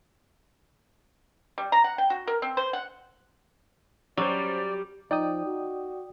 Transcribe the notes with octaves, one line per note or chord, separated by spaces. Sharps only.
G3
A#5
F#5
G5
F#4
A#4
C4
C5
F#5
F#3 G3 C#4 F#4 C5 D5
F3 D#4 D5 G5 D#6
F#4